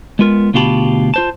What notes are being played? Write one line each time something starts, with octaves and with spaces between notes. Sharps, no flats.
G#3 B3 F4 A#4
D2 B2 F4 G4 A5 B5
F4 C5 A5